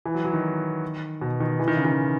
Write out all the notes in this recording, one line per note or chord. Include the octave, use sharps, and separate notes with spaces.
E3
F#3
F#3
D#3
B2
D#3
E3
D#3
C#3
D#3